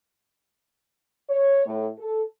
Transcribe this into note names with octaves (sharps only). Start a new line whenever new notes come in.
C#5
A2
A4